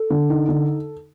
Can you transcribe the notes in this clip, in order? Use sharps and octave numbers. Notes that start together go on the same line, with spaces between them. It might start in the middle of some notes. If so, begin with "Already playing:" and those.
Already playing: A4
D3
D#4
D3